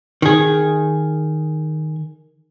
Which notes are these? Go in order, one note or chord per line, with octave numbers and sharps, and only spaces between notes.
D#3 G#4